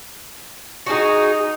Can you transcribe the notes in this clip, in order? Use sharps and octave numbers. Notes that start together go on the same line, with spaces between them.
D#4 F#4 G#4